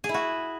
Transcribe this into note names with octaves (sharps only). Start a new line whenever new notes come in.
G#4
E4
F#4